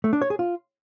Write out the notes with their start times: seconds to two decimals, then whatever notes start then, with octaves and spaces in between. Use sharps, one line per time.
0.04 A3
0.13 D4
0.22 C#5
0.30 G#4
0.39 F4